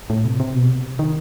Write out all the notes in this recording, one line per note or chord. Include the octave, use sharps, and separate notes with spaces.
A2
C3
C3
B2
C3
D#3